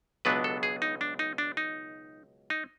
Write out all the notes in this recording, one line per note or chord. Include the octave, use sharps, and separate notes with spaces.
C#2 B2 F#3 B3 D4 B4
A4
G#4
D#4
D4
D#4
D4
D#4
D#4